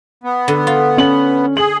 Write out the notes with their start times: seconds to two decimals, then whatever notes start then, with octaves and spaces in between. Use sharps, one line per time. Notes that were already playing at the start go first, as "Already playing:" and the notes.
0.24 B3
0.48 D3
0.67 F4
0.97 C#4 F#7
1.57 G#4 F#7